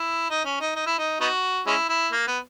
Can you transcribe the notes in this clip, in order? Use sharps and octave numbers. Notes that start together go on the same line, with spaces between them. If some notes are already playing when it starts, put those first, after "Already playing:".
Already playing: E4
D#4
C#4
D#4
D#4
E4
D#4
B3 D#4 F#4
G#3 C#4 E4
E4
A#3
B3